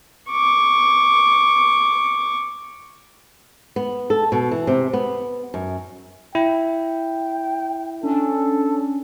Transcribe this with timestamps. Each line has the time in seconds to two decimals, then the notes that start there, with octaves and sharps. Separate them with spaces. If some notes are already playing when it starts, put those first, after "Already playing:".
0.31 C#6 D6
3.76 B3
4.10 A4
4.32 B2
4.51 E3
4.67 C3
4.93 B3
5.54 F#2
6.35 E4 G5
8.03 C#4 D4 A4